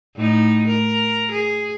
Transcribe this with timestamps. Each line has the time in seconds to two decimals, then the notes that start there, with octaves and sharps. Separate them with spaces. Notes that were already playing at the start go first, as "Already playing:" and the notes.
0.16 A2 D#4
0.67 A#4
1.32 G#4